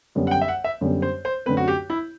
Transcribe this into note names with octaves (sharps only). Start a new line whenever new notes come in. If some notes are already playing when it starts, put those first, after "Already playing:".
F#2 D3 G3 B3
F#5
G5
E5
F#5
E5
F#2 D3 G3 B3
C5
C5
F#2 D3 A3 C4 B4
F#4
G4
E4